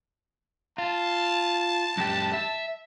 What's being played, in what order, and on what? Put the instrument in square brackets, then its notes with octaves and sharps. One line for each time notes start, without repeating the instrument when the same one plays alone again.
[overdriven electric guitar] F4 [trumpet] A5
[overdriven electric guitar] F#2 G4
E5